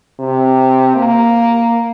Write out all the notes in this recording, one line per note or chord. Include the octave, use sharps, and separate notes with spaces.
C3
A#3